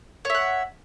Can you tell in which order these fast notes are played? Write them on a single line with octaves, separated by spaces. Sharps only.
C#5 E5 F#5